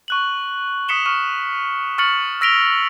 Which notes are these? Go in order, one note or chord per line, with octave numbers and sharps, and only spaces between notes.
C#6 F#6 F#7
C#6 D#6 B6 C#7 E7 G7
C#6 F6
C#6 F6 A6 C#7 F#7
E6 A#6 B6 D7 F7 G7